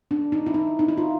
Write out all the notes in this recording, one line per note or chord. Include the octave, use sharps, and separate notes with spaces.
D4
D#4
E4
D#4
D#4
E4
F4